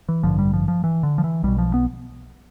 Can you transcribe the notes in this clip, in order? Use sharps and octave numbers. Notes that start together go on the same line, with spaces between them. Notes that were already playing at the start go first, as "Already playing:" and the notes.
E3
A1 G2 D3 F3
G3
F3
F3
E3
D3
F3
E3
B1 B2 G3
F3
B3